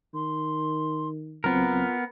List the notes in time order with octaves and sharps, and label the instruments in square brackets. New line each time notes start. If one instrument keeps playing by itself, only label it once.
[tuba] D#3 [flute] C6
[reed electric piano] C#2 F#3 C4 [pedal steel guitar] B3 A#4 [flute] F4